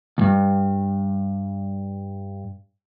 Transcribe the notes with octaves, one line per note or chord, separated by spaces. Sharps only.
D2 G2